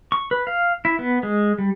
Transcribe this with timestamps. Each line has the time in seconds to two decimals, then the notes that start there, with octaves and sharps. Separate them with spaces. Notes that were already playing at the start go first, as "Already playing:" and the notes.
0.12 C#6
0.31 B4
0.47 F5
0.85 E4
0.99 B3
1.23 G#3
1.58 G3